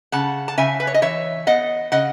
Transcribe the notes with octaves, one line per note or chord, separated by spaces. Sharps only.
C#3 F#5 A5
A5
C#3 E5 G#5
B4
C#5
D#5
E3 C#5 E5
B3 D#5 F#5
C#3 D#5 F#5